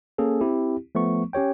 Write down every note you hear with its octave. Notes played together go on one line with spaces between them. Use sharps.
A#3 C#4 G#4 A4
C4 E4 G4
F3 A3 B3 C#6
C#4 G4 C#5 G5